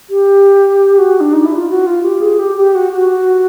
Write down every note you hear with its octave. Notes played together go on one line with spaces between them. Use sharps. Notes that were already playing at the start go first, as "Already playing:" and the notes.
G4
F#4
D4
D#4
E4
F4
F#4
F4
G4
G#4
G4
G4
F#4
F#4